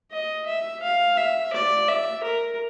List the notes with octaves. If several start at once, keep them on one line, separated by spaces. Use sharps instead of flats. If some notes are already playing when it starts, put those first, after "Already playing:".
D#5
E5
F5
E5
D5
E5
A#4